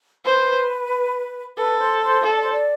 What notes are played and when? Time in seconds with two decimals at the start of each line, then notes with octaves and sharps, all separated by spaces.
0.25 B4 C5
1.57 A4 B4
1.79 C5
2.02 C5
2.23 A4
2.33 D5
2.41 C5
2.51 D5